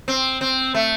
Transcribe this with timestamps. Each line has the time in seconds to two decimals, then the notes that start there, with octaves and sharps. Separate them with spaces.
0.08 C4
0.41 C4
0.74 A3